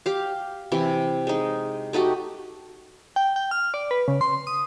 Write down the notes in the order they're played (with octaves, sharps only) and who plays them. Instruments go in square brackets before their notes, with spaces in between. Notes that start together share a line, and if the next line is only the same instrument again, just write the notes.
[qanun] G4 F5
C3 E3
G#3 D#4
A3 D#4 F#4 G4
[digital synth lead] G5
G5
F6
D5
B4
C#3
C6
D#6